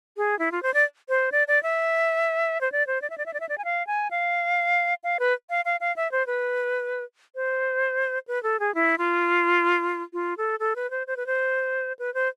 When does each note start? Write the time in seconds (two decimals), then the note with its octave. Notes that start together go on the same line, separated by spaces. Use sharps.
0.17 G#4
0.39 E4
0.52 F4
0.63 C5
0.74 D5
1.09 C5
1.32 D5
1.48 D5
1.63 E5
2.61 C5
2.72 D5
2.87 C5
3.02 D5
3.10 E5
3.18 D5
3.26 E5
3.34 D5
3.40 E5
3.49 D5
3.58 G#5
3.64 F5
3.87 G#5
4.11 F5
5.04 F5
5.20 B4
5.50 F5
5.65 F5
5.80 F5
5.96 E5
6.12 C5
6.27 B4
7.35 C5
8.28 B4
8.43 A4
8.60 G#4
8.75 E4
8.98 F4
10.13 F4
10.38 A4
10.60 A4
10.76 B4
10.91 C5
11.07 C5
11.17 B4
11.26 C5
11.99 B4
12.14 C5